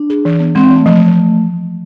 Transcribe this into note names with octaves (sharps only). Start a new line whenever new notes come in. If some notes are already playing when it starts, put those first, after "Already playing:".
Already playing: D4
G#4
E3
B3
G#3 C4
E3 A3
F3